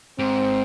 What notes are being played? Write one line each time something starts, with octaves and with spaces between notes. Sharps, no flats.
G#2 C4